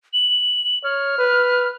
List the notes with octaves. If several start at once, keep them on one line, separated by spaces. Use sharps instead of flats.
F#7
C#5 F6
B4